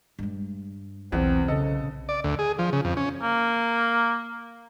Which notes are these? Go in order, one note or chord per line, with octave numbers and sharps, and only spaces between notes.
G2 G#3
B1 E2 C3 C4
C#3 A4 D#5
D5
D2
G#4
F3
C#3
F2
C#4
A#3